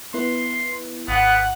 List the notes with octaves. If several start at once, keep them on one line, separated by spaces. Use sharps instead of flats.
B3 E4 B4 C6
G#1 B3 F#5